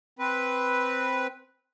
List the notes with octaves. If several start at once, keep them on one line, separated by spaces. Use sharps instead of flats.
C4 B4